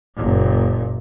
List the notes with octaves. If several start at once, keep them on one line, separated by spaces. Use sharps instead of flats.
F#1 A#2